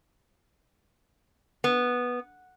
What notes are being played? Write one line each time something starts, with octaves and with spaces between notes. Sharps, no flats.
B3